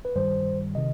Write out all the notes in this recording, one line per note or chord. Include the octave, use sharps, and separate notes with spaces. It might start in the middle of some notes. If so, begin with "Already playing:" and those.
B4
G2 D#3 G3 C5
C3 D#3 D#5